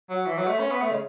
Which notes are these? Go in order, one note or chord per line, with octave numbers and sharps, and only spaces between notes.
F#3
E3
F#3
A3
C#4
B3
A3
C#3